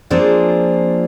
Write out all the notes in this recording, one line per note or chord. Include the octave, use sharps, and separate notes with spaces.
F3 A#3 C4 D4 F4 G#4